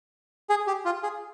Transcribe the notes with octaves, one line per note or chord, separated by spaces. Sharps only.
G#4
G4
F4
G#4